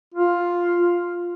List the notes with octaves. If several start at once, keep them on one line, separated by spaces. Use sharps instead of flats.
F4